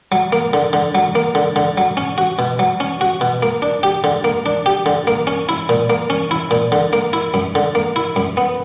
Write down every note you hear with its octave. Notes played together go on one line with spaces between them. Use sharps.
F#3
A#3
D3
D3
F#3
A#3
D3
D3
F#3
C#4
F#4
B2
F#3
C#4
F#4
B2
A#3
D4
G4
D3
A#3
D4
G4
D3
A#3
C#4
E4
A#2
A#3
C#4
E4
A#2
D3
A#3
E4
F#2
D3
A#3
E4
F#2
B3